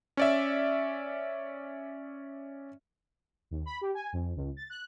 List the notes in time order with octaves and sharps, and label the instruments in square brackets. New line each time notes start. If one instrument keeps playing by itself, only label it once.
[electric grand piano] C#4 D5 E5
[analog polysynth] D#2
B5
G4
G#5
F2
C#2
A6
F#6